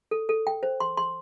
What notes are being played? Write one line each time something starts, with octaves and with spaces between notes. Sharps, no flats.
A4
A4
G5
C5
C6
C6